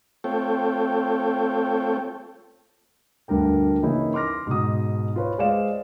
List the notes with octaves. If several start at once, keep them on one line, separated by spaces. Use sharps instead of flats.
A3 C4 F4 A4 C#5 G5
D2 G2 D4 A#4 G5
C#3 E3 A#3 D#4 E4
C6 D6 F6 A#6
G#2 B2 D#6
F4 B4 C#5
G#3 C5 D5 F5 E7